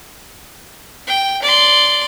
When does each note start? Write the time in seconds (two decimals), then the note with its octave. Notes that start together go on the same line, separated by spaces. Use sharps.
1.07 G5
1.42 D5 C6